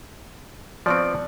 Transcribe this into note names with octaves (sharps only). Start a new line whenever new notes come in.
F3 B3 C4 D5 C#6 D7